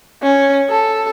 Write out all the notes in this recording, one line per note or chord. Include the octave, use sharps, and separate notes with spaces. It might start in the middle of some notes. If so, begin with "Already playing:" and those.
C#4
A4